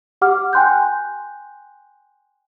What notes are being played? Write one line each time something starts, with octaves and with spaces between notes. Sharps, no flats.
G4 F#5 D6 F6
G5 G#5 C6 F#6 G6